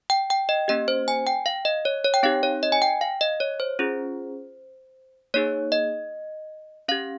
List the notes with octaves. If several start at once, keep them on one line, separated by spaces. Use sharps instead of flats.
G5
G5
D#5
A#3 C#4 G4 D#5
C5
G#5
G5
F5
D#5
C#5
C#5
G5
C4 D#4 G4 F5
C#5
D#5
G#5
G5
F5
D#5
C#5
C5
C#4 F4 G#4
A#3 D#4 G#4 C#5
D#5
C#4 G4 F5